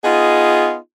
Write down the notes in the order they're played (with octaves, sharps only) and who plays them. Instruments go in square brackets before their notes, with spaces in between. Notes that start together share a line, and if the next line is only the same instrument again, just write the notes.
[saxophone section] B3 D#4 F4 G#4